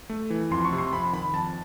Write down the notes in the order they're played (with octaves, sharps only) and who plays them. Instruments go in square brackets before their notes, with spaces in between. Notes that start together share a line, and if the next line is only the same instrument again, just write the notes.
[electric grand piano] A3
E3
[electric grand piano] F2 [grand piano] C6
[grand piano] C#6
[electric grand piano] C3
[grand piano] C6
[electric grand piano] F2 [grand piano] B5
[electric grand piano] D#3 [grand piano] B5
[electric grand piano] F2 [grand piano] A5